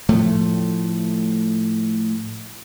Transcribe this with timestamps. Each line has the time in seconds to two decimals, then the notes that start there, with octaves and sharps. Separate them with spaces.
0.09 A2 F3 A3